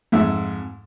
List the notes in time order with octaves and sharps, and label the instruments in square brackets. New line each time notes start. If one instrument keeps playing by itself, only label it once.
[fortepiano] F2 G#2 E5